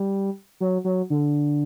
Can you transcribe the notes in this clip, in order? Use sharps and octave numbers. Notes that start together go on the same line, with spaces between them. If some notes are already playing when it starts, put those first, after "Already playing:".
Already playing: G3
F#3
F#3
D3